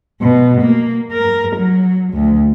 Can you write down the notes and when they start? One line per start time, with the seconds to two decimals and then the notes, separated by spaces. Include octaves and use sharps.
0.21 B2
0.61 A#3
1.12 A#4
1.56 F#3
2.13 D2